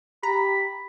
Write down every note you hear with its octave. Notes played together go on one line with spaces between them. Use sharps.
G4 A#5 B5